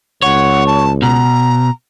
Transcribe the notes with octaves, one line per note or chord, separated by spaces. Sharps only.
C#2 C#5 F#5
A5
B2 A#5